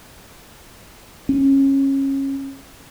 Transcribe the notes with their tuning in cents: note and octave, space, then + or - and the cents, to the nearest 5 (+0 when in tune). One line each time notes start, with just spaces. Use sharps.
C#4 -25